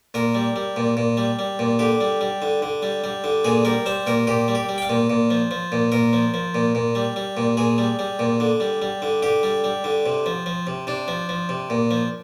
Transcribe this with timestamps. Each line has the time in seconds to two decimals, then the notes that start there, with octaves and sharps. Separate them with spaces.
0.14 A#2 A#4
0.35 G3
0.56 G3
0.76 A#2
0.97 A#2
1.17 G3
1.39 G3
1.59 A#2
1.79 D3 G4
2.01 G3
2.21 G3
2.42 D3
2.62 D3
2.83 G3
3.04 G3
3.24 D3
3.44 A#2 G#4
3.65 G3 A#4
3.86 G3 C5
4.06 A#2 A#4
4.27 A#2 G4
4.48 G3
4.55 G4
4.69 G3
4.78 G5
4.82 F5
4.89 A#2
5.10 A#2
5.30 F3
5.51 F3
5.72 A#2
5.92 A#2 A#4
6.13 F3
6.34 F3
6.55 A#2
6.75 A#2
6.95 G3
7.16 G3
7.37 A#2
7.57 A#2 G#4
7.78 G3
7.99 G3
8.19 A#2
8.40 D3
8.60 G3
8.82 G3
9.02 D3
9.23 D3 G4
9.43 G3
9.64 G3
9.84 D3
10.06 C3
10.26 F3
10.46 F3
10.67 C3
10.87 C3 D4
11.08 F3
11.29 F3
11.49 C3
11.70 A#2
11.91 F3